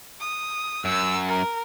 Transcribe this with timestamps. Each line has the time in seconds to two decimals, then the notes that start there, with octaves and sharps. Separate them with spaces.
0.20 D#6
0.85 F#2 E6
1.28 A#4